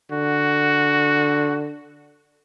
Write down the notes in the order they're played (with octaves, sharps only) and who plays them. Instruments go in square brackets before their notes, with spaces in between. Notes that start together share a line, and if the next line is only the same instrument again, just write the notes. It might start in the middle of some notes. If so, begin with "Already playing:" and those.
[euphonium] D3 [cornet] F#4